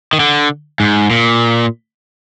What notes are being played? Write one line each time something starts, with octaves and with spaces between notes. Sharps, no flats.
D#3
D3
G#2
A#2